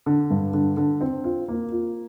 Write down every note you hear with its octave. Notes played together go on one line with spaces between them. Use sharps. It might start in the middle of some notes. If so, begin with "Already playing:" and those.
D3
G2
D3
D3
C4
F4
A#3
F4